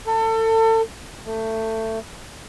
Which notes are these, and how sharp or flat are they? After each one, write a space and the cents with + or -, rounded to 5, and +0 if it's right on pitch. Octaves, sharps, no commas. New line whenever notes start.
A4 +30
A3 +20